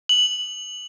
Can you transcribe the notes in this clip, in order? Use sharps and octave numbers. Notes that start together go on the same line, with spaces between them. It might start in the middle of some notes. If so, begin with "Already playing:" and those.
F#7